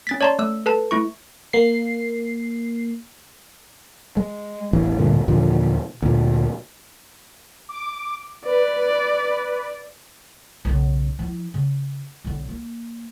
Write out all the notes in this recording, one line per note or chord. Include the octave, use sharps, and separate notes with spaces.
C#4 A6 B6
C#5 D5 A5 A#5 C6
A3 E6
A4 B4 A5
A3 E4 C#6
A#3 C7
G#3
E1 A1 E3
D1 G2 A#2 D3
D#2 A#2 D3 F3
D2 A#2
D6
B4 D5
B1 C#3
F3 E4
C#3
B1 D3
A#3